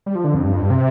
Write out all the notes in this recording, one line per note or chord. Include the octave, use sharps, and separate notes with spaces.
G3
F3
D3
F2
G2
F2
G2
C3